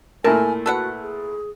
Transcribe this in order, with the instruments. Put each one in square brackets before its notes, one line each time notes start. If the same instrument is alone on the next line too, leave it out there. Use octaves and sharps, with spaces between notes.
[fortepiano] A#2 A3 E4 [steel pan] A#4 [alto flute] G#5 [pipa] A5
[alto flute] F#4 [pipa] A4 B4 F#5
[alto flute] G#4